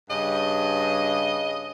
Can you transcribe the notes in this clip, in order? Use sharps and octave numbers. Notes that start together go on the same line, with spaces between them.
G2 C#3 D#5